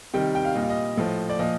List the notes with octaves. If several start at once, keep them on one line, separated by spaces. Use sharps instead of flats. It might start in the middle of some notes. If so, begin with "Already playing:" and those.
C3 D#3 G3 G5
G5
F5
A#2 G3 D#5
F5
D#5
A2 F3
D5
A#2 F3 D#5